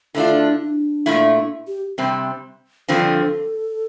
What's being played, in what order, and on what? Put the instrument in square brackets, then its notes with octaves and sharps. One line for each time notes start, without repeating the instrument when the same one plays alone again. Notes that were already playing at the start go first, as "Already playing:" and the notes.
[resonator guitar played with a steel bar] D3 A3 D4 F4 [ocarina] E4
[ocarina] D4
[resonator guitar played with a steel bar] A#2 A3 E4
[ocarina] G4
[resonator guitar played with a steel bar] C3 G3 C4
[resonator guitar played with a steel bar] G2 D3 F3 C4 [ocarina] A4